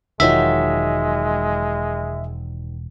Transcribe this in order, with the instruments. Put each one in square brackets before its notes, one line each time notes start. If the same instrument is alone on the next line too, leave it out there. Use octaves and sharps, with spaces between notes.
[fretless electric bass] E1 [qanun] D#3 F#3 F4 [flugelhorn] G#3 [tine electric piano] E5